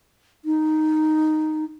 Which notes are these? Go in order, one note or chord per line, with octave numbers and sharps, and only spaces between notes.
D#4